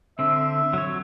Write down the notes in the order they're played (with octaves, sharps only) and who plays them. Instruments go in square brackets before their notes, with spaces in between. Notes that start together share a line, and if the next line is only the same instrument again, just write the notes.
[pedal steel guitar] D3 C4 [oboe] E5
[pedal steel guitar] F#3 C#5